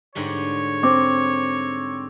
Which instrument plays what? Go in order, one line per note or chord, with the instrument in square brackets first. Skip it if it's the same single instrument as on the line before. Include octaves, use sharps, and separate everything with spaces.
[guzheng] G#2 D3 G3 [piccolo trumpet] C#5
[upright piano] C4 [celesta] D6